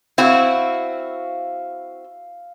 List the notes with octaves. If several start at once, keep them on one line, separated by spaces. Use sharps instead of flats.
C4 E4 F#4 F5 E6